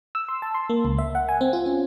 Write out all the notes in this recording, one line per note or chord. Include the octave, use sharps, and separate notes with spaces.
E6
C6
A5
C6
A#3
C#2
E5
F#5
G#5
C4
F4
C#4